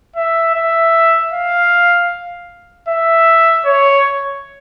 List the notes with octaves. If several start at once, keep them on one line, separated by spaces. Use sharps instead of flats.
E5
E5
F5
E5
C#5